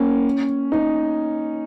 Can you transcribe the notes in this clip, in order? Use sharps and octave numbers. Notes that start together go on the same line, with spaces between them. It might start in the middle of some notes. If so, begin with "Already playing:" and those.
Already playing: A#3 C#4
D#4